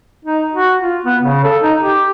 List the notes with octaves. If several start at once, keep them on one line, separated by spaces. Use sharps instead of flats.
D#4
F#4
F4
B3
C#3
A4
D#4
G4